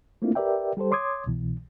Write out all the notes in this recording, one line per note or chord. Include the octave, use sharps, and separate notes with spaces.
A3 A#3 C4 D4 E4 F4
G4 A#4 B4 D5 E5 G5
G3 G4 A4 C5
C#5 C6 D6 D#6 G#6
C2 B2 E3